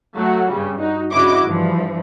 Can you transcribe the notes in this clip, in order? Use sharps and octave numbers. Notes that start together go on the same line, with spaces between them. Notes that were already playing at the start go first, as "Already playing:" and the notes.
F#3 A3 F#4
G2 C#3 G3
D#4 F#4
G2 C#3 E4 F#4 D#5 D6
G2 E3 F3